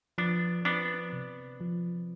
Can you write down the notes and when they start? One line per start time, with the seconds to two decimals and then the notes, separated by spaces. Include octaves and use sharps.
0.18 F3 B3 D4
0.65 B3 C4 D4
1.13 C3
1.61 F3